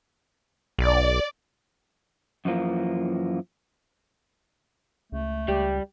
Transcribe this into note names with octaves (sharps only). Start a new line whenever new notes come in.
B1 D5
F#2 E3 F3 A#3
C#2 A3
C#2 G3 G4